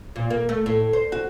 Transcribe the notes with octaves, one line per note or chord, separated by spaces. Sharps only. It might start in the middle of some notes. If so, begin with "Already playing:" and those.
A#2
A#3
A3
A2
C5
F#4